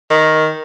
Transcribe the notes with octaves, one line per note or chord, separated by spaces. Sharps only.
D#3